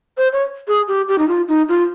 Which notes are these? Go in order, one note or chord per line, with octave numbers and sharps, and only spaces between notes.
C5
C#5
G#4
G4
G4
D#4
F4
D#4
F4